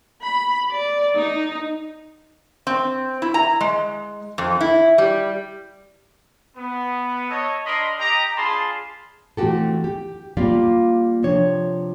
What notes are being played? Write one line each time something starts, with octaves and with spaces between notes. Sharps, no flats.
B5
D5
D#4
C4
E4
A#5
G#3
F2
E4
G3
B3
A4 C#5 D#5
D4 A#4 D#5 B5 C6
G4 D#5 A#5
D4 F4 G#4 A5 B5 C6
E3 A3 C4 F#4 G4 A4
G4
G3 A#3 F4 G4 D5 F5
C3 F3 D4 C#5